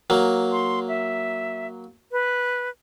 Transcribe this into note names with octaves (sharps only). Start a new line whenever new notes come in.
F#3 A#3
C6
E5
B4